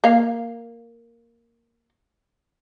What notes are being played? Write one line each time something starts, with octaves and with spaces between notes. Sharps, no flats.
A#3 F5